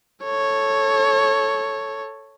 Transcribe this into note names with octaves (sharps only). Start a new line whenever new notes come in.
A4 C#5